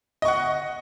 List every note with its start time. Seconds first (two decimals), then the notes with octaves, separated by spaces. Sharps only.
0.22 D#5
0.25 C#6
0.28 F#5